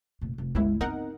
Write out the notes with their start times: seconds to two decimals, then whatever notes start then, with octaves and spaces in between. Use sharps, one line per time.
0.22 F1 A#2
0.38 F1
0.55 G1 C#2 G#3 B3 E4
0.81 B3 C4 D#4 A#4 F#5